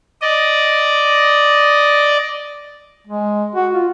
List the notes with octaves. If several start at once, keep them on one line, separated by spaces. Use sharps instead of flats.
D5 D#5
G#3
F#4
F4